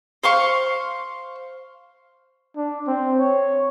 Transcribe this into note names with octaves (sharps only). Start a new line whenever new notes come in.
C5 F5 C6 C#6
D4
C4
C#5